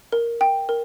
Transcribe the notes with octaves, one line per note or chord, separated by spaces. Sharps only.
A#4
G5
A#4